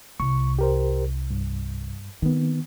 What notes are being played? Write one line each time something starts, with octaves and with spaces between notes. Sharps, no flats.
C2 C#6
G4 A#4 C5
G2
D#3 B3 C4